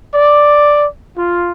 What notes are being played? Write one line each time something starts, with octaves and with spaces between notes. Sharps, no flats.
D5
F4